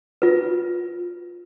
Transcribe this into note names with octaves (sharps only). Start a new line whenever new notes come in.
F4 B4